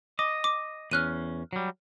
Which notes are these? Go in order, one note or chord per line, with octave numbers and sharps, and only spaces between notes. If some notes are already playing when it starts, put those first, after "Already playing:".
D#5 D6
D6
E2 C#4 F6 F#6 D#7
F#3 G3